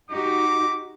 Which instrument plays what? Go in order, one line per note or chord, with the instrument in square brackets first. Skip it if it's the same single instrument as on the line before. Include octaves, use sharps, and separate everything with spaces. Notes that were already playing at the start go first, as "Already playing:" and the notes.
[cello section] D#4 F#4 G4 [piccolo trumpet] D6